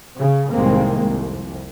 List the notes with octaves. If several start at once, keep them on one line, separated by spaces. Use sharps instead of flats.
C#3
C2 A2 D#3 G#3 A#3 C4
C2 F2